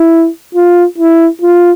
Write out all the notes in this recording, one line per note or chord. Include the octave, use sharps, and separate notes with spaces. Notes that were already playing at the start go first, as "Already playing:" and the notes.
Already playing: E4
F4
E4
F4